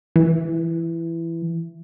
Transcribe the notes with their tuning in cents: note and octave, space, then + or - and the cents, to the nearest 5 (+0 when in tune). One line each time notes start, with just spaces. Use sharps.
E3 +10